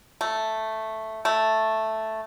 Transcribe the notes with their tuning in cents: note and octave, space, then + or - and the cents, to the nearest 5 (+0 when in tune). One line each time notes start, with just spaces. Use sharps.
A3 +0
A3 +0